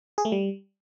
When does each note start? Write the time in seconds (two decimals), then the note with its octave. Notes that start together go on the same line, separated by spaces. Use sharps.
0.18 G#4
0.25 A3
0.32 G3